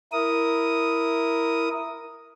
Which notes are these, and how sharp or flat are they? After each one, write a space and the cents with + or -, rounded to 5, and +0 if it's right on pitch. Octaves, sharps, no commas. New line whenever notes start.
E4 +0 A#4 +0 D#6 +0